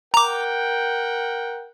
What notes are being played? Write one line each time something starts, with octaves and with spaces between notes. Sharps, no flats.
A#4 F#5 G5 A#5 D6